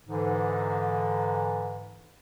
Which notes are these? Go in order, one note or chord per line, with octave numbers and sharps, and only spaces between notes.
G#2 D3 E3